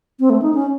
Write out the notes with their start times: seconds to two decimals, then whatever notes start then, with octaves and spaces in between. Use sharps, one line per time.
0.20 C4
0.30 A3
0.42 D#4
0.54 C#4